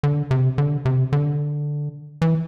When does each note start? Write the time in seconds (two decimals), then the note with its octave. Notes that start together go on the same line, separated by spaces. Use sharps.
0.03 D3
0.31 C3
0.58 D3
0.85 C3
1.13 D3
2.22 E3